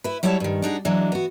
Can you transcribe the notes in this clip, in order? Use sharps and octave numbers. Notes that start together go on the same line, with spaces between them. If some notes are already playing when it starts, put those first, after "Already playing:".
E4 B4
F#3 G3 E4 C#5 D#5 A5
G2 D#3
D4 D#4 F#4 G#4
E3 F#3 G#3 D4
B3 F#4